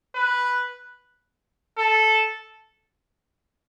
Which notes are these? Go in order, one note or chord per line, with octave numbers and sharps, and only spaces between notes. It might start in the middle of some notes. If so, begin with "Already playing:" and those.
B4
A4